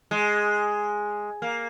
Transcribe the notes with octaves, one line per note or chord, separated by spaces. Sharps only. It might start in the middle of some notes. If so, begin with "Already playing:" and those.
G#3
A#3